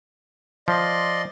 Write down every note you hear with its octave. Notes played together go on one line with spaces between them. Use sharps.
F3 D5 D#5 C6